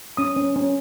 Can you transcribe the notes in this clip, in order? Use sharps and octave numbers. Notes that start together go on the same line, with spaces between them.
C#4 D#6
C#4
C#4